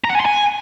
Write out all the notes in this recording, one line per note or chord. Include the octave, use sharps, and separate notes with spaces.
A#5
F#5
G#5
C6
G#5